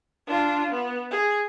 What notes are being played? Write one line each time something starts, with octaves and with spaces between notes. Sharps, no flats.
D4 F4
B3
G#4